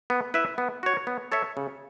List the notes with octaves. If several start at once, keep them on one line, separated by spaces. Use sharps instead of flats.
B3
E4 B4 E5
B3
F#4 C#5
B3
A4 C#5 E5
C#3